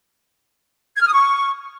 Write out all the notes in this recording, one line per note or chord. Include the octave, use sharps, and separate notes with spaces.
G#6
F6
D#6
C#6